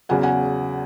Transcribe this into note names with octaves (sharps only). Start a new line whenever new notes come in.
E2 C#3 F#3 F#5 G#5
F#5 G#5